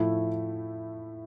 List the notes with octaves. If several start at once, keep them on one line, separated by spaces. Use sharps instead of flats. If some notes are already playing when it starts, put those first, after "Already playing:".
Already playing: A2 F3 A3 E4